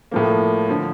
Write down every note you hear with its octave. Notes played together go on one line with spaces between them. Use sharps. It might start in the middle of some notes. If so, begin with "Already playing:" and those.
A2 F3 A#3
D3 F3